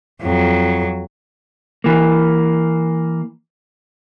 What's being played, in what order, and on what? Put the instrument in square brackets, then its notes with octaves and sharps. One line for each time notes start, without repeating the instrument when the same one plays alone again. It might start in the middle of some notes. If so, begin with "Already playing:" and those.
[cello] F2 F#3
[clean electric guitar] E3 A#3